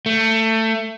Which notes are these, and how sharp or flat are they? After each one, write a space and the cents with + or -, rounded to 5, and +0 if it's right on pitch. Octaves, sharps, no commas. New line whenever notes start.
A3 +20